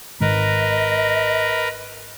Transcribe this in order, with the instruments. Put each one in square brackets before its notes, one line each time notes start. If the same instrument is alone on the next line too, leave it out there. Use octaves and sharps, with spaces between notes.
[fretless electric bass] G#1 [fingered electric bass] G#2 D#3 [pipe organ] A#4 B4 [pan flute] D#5